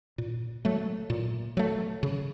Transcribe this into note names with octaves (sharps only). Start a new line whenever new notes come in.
A#2
F#3 A3
A#2
F#3 A3
C#3